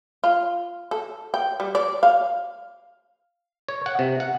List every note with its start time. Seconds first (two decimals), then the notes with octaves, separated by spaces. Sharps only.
0.24 F4
0.91 A4
1.34 G5
1.60 G3
1.75 D5
2.03 F5
3.69 C#5
3.86 F#5
3.99 C3
4.20 F#5